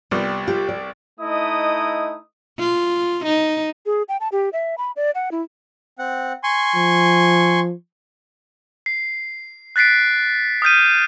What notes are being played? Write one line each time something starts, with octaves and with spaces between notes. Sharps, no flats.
C2 G3 B3 F4 D5
F4 G4
D5
A3 D#4 E4 D#5 D#6
F4
D#4
G#4
G5
A5
G4
E5
B5
D5
F#5
E4
C4 F#5
G#5 C6 C#6
F3
C7
F#6 A6 B6 C7 D7
D#6 F6 G6 D#7